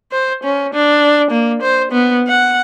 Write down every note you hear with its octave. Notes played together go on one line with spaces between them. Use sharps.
C5
C#4
D4
A#3
C5
B3
F#5